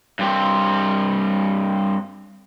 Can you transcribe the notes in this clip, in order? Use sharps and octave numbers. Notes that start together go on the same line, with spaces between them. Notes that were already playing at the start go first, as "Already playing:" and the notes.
G2 C4